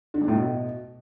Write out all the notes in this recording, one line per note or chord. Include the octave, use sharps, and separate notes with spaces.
D3
G2
A2
B2